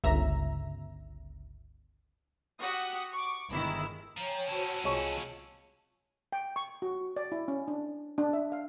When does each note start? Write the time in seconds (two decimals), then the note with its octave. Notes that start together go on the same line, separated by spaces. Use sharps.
0.04 G1 C#2 E5 A#5
2.61 F#4 G4 F#5 D#6
3.13 C#6 D6
3.52 G1 D#3 G#3 E4 E6
4.17 F3 C#5 G5 G#5 A#5
4.47 C#4 E4 F#4 C5 C#5 A5
4.84 C2 G#3 F4 C#5
6.32 G5
6.56 C#6
6.82 F#4
7.16 D5
7.32 E4
7.48 C#4
7.68 D4
8.18 D4
8.33 E5
8.52 F5